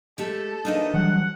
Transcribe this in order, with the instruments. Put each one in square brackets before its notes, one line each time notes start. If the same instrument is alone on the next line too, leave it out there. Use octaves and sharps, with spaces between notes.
[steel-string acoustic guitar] G#3 A3 G4 [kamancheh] A4
[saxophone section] E2 A#3 D#4 [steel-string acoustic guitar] D4 F#4 D#5
[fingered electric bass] E3 F#3 G3 [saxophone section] F#5